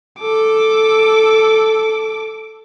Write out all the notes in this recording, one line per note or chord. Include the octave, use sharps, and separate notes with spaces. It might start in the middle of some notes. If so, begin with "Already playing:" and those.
A4 D6